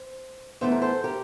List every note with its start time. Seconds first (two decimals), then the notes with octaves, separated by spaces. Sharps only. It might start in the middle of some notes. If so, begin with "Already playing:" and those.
Already playing: C5
0.61 E2 E3 A3 C5
0.72 A#4
0.82 A4 C5
1.04 G4 A#4